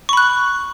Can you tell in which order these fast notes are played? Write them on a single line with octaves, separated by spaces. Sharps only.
C#6 B5 F#6